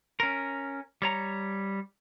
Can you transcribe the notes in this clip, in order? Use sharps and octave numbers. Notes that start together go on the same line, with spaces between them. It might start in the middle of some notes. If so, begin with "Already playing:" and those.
C#4 A#4
G3 C#5 A#5